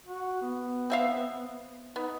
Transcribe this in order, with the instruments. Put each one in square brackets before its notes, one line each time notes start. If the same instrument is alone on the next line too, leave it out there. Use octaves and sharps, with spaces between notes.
[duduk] F#4
B3
[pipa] C4 E5 F5
[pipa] B3 [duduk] D#4